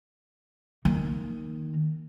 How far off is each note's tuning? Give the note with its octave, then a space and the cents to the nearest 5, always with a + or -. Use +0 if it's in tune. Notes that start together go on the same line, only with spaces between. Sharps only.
D#3 -5 A#3 +0